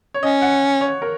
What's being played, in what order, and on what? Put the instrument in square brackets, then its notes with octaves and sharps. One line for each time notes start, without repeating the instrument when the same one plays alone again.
[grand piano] C#5
[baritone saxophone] C#4 [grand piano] D#5
[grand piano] F#5
C#5
A#4